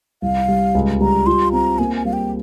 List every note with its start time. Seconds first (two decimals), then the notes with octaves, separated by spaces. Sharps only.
0.22 C2 F5
0.48 G3
0.75 C#2
1.01 G3 A#5
1.26 F4 C6
1.53 C4 A#5
1.79 A#3 G#5
1.96 G#5
2.05 G3 F5
2.13 G5